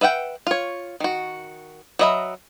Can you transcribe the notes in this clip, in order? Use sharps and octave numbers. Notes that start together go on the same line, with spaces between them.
B4 E5 F#5 G5
F4 C#5
D#3 F#4
F#3 B4 D#5 E5 B5